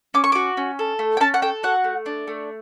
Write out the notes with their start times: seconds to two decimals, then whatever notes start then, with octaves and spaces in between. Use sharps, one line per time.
0.14 C#4 D6
0.24 C#6
0.32 F#4 D6
0.57 C#4
0.79 A4
0.99 A3
1.17 G5
1.20 C#4 A5
1.34 F#5
1.42 A4 G5
1.63 F#4 F#5
1.84 A3
2.06 D4
2.27 A3